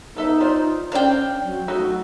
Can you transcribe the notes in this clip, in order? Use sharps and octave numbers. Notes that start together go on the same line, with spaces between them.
B3 D#4 A4 E5
F4 C5 D5
C#4 D4 C5 D5 F5 G5
F#3
F#3 A3 D#4 F#4